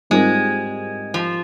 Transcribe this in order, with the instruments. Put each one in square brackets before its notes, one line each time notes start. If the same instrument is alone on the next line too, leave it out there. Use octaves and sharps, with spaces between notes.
[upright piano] G#2 G3 C4 F4 A#4 [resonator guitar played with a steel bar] G#3
[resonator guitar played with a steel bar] F3